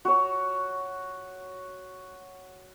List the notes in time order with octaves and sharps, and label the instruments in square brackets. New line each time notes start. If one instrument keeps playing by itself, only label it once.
[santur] F#4 C#5